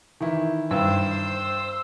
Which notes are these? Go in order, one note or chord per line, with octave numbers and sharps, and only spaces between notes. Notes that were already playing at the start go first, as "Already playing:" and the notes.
D#3 E3 E4
G2 C5 E6